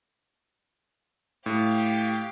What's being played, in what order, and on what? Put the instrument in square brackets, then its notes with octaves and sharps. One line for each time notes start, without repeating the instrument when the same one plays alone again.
[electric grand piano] A2 [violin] G4 F5